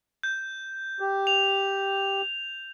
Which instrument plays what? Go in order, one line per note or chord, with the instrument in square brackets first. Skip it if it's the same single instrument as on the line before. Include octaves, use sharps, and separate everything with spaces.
[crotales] G6
[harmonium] G4
[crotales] F7